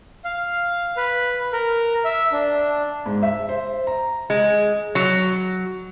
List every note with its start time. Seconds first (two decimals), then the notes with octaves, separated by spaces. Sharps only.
0.25 F5
0.97 B4
1.53 A#4
2.05 E5
2.32 D4
3.06 G#2
3.23 E5
3.49 C5
3.87 A#5
4.30 G#3
4.95 F#3